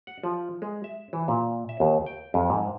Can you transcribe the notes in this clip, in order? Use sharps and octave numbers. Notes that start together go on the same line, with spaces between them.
F#5
F3
G#3
E5
E3
A#2
E5
D#2
G5
F2
G#2